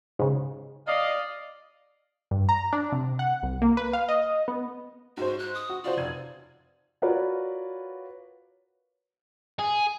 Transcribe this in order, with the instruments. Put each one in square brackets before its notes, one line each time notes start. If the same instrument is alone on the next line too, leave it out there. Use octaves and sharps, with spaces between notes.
[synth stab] G#2 C#3
[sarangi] D5 [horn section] D#5 F5
[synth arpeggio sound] G2
A#5
D4
C3
F#5
C2
A#3
B4
F5
D#5
B3
[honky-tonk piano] G#2 C5 [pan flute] F#4
[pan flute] F#6
D#6
[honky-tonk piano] F#4
[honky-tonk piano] F4 F#4 C5 [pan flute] D5
[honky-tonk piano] F1 G#6 D#7
[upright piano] F4 F#4 A#4 B4 C#5 D5
[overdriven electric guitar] G#4